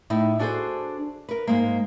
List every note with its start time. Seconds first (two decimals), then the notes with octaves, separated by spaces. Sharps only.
0.10 A2 D#4 E4
0.39 D4 F#4 G#4 A4 C5
1.29 A#4 B4
1.47 G#2 G#3 A#3